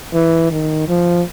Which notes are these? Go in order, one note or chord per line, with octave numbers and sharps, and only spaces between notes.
E3
D#3
F3